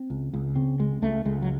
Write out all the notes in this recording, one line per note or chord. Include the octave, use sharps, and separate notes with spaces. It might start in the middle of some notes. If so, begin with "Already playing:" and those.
Already playing: C4
C#2
C#2
C#3 C4
C#2 G#3
C#2 A3
C#2 G#3
F#3